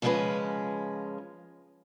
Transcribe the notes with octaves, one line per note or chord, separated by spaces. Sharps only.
C#3 F3 G3 G#3 C#4 B4